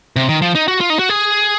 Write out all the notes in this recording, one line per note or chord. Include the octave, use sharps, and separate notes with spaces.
C3
D#3
F3
D#4
F#4
F4
D#4
F#4
G#4